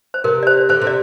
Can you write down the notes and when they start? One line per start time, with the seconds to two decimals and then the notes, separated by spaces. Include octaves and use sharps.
0.14 C5
0.24 C3 A#4
0.43 D5
0.47 C5
0.69 D3 C5
0.81 C3
0.87 D5